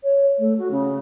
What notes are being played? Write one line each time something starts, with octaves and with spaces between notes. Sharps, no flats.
C#5
A3
F#4
C#3